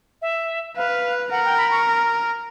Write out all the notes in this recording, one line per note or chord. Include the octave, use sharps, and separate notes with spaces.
E5
B4 F5
A#4 F#5
G5
B5
C#6